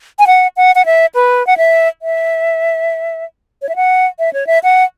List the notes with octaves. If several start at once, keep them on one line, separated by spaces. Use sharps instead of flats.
G#5
F#5
F#5
F#5
E5
B4
F#5
E5
E5
C#5
E5
F#5
E5
C#5
E5
F#5